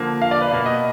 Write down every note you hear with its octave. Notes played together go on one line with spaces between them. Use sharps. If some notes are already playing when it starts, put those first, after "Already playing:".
Already playing: D3 F3 A#3
F5
D5
B4
B2 A#3
D#5